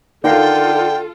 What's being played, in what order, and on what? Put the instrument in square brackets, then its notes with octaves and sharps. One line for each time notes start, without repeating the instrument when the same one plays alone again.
[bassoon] D3 [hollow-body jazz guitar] D#4 A#4 F5 [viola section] F4 A4 [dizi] G5